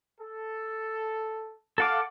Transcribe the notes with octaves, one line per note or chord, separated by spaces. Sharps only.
A4
A4 F5 F#5 D6